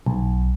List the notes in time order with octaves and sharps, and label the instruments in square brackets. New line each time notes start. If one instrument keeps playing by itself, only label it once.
[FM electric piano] B1